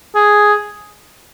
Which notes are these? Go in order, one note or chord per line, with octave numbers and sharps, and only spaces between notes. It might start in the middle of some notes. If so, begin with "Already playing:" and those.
G#4